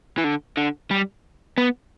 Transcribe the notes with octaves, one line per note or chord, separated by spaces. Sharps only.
E3
D3
D3
G3
B3